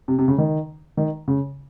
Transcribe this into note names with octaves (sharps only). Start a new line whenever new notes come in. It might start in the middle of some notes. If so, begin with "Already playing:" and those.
C3
C3
C#3
D#3
D#3
C#3